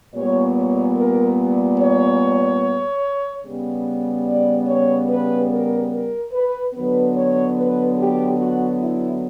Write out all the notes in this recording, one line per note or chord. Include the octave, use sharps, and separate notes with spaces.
A#2 G3 B3 C#5
C#5
A#4
C#5
C#3 G3 B3
D5
C#5
B4
A#4
A#4
B4
D3 F#3 B3 B4
C#5
B4
G4
F#4
E4